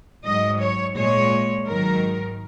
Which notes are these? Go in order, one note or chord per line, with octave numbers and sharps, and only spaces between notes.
G#2 F#3 D#5
C#5
A#2 G#3 C#5
G#2 D#3 F#3 A#4